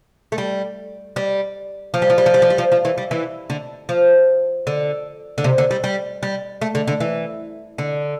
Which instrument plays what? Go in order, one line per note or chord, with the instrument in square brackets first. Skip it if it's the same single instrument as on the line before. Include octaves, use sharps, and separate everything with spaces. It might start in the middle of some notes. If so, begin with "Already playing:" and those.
[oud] A3
G3
G3
F3
G3
F3
G3
F3
G3
F3
G3
F3
F3
E3
G3
E3
D3
F3
D3
D3
C3
D3
G3
G3
G3
A3
D3
D3
E3
D3